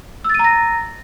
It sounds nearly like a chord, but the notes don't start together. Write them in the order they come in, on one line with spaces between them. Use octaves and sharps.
E6 A6 D#7 A#5 A#6